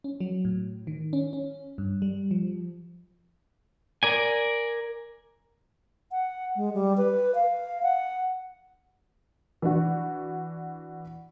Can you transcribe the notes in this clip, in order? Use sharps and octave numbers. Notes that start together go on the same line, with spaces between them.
C#4
F#3
A2
D#3
C#4
C#4
G2
G3
F3
A#4 D5 G#5
F#5
G#3
G3
B4
F5
F#5
E3 D4 F#4